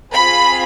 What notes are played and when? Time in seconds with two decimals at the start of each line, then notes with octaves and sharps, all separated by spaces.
0.13 C4 F4 G#4 B5